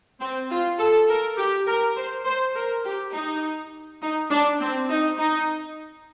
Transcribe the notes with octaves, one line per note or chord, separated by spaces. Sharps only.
C4
F4
A4
A#4
G4
A#4
C5
C5
A#4
G4
D#4
D#4
D4
C4
D#4
D#4